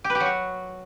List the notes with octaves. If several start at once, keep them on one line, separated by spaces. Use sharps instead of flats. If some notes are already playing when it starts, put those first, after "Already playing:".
G4
B4
G4
F#3
F#4